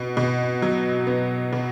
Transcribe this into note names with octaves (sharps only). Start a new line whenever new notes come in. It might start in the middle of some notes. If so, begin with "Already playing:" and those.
Already playing: B2
B2
F#3
B3
B2